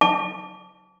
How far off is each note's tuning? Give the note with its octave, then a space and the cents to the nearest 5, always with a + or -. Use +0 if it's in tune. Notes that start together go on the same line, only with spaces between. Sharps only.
A5 +0 D6 -35